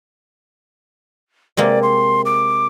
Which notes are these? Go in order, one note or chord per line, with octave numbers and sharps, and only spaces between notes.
C3 G#3 A#3 D5
C6
D6